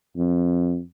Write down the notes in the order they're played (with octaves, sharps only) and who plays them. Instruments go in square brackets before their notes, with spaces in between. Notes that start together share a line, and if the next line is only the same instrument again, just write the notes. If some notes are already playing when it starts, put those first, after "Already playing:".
[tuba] F2